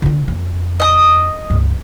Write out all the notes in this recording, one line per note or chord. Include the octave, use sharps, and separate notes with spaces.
D3 F4
F2
D#5 D#6
C#2 G2